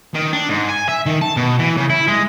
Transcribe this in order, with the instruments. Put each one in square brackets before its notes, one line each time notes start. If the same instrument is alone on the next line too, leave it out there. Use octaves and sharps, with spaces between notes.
[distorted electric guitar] D#3
D4
G#2
G#5
E5
D#3
A5
B2
E3
C#3
E4
G#3